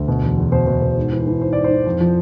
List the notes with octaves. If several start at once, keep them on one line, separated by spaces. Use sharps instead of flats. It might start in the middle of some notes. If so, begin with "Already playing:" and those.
Already playing: D2
B2
E2
E2
B2 C5
B2
B2
G#2
E3
E3
G#2 C5
G#2 D5
C5
E3
F2
F3